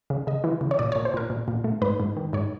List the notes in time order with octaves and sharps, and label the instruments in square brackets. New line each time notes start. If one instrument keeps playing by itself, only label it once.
[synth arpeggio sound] C#3
C#3 D#5
E3
C#3
C#5
A#2 D5
A#2 C#5
C5
A#2 A#4
A#2
A#2
A3
G#2 B4
G#2
D#3
G#2 C#5